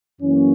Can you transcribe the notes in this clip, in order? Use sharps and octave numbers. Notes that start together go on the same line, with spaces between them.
F#2 E3 A#3 C#4